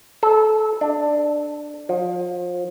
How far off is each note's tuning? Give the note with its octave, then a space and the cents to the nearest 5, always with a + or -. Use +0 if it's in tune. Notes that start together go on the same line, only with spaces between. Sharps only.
A4 -25
D4 +10
F3 +30